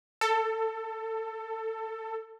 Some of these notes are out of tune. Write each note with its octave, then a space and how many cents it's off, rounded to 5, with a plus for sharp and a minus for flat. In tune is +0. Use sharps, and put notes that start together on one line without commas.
A4 +20